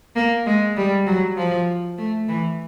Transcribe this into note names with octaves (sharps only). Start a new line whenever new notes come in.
A#3
G#3
G3
F#3
F3
A3
E3